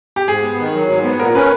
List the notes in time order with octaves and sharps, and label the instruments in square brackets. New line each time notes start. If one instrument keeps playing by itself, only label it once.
[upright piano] G4
[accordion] G#2 [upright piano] G#4
[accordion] B3
D#3
F#3
G#2
B3
[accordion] A#2 [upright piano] A#4
[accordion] C#4 [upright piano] B4